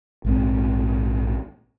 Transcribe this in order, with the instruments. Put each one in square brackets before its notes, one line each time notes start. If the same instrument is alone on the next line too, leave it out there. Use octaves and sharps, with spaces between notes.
[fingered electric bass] A#1 G#2 C4